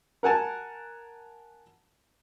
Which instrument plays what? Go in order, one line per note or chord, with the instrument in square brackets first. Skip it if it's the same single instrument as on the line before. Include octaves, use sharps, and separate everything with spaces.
[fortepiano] A#4 F#5 G#5 A5